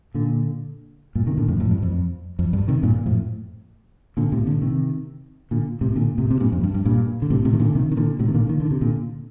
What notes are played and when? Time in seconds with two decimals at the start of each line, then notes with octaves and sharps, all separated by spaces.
0.14 A#2 D3
1.15 G2 A#2
1.27 C3 D#3
1.38 A#2 D3
1.48 F2 A2
1.60 F2 A2
1.71 G2
1.83 F2
2.39 F2
2.53 G2
2.68 C3 D#3
2.83 G2 A#2
3.06 F2 A2
4.17 A#2 D3
4.32 A2 C3
4.46 A#2 D3
4.62 C3 D#3
5.51 A#2 D3
5.81 A2 C3
5.96 A#2 D3
6.18 A2 C3
6.31 C3
6.40 G2 A#2
6.52 F2
6.64 G2
6.74 G2
6.85 G2 A#2
7.22 D3
7.30 A2 C3
7.45 A2 C3
7.53 D#3
7.60 A#2 D3
7.75 C3 D#3
7.92 D#3
7.97 A#2 D3
8.19 A2 C3
8.28 D#3
8.34 A#2 D3
8.49 D#3
8.60 D3
8.71 C3
8.81 A#2 D3